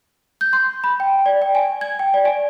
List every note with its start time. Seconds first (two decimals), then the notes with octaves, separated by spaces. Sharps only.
0.41 G6
0.53 C6
0.84 B5
1.00 G5
1.26 D5
1.42 G5
1.55 G#5
1.81 G#6
1.99 G5
2.14 D5
2.25 G#5